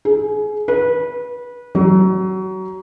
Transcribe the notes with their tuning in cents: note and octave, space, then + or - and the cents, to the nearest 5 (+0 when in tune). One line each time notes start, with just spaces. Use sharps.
G#4 +25
B4 -20
F#3 +25